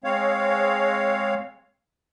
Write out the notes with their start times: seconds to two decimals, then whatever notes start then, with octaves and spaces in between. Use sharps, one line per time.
0.04 G#3 C4 C#5 F5